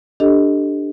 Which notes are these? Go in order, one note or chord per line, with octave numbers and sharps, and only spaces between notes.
D4 G4 A4 D#5